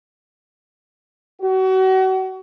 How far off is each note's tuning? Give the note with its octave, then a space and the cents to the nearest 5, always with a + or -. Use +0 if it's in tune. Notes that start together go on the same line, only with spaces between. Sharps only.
F#4 +35